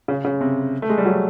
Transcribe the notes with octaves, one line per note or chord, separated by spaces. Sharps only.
C#3
C#3
C3
A3
G#3
G3
F#3